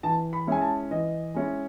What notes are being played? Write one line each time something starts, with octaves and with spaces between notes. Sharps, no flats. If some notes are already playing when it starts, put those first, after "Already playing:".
E3 A5
B5
G#3 C#4 E4 G#5
A5
E3 D#5
G#3 C#4 E4